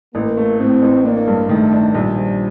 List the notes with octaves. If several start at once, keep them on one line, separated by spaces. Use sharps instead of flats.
A1 A#3
A3
A2 C4
A1
A#3 D4
G2
D#3 A3
D4
A#1 G3
F3